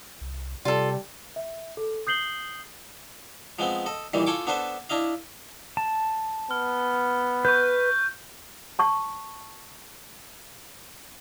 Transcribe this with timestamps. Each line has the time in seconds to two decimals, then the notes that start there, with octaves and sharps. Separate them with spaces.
0.21 C2
0.65 C3 G3 F4 A4 D5
1.36 E5
1.77 A4
2.07 D#6 G6 C7 F#7 G7
3.59 F3 G#3 B3 C4
3.86 A4 D#5
4.14 A#2 D#3 E3 G3
4.26 F4 A4 G5 G#5 C#6 D6
4.47 B3 D4 A4 B4 C5
4.90 D4 E4 D#5 F5
5.77 A5
6.51 B3 F6
7.45 B4 C#6 G6
8.79 A5 C#6